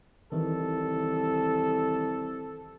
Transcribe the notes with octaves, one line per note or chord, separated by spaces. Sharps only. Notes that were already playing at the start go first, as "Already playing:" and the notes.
C2 D#3 E3 A4